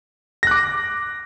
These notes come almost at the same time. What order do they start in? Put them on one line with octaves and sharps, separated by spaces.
A#6 F#6 D6